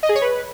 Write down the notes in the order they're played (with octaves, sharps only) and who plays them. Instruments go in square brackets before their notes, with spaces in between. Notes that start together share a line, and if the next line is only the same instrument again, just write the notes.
[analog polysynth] D#5
G#4
C#5
B4